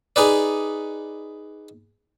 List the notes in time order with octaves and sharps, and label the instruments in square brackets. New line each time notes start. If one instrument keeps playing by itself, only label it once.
[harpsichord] D#4 G#4 B4 D5